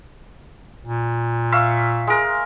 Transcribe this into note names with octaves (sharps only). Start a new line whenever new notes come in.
A#2
E5 F5 C#6
G#3 A#4